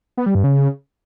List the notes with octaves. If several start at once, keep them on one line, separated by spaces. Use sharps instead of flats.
B3
G3
G2
C#3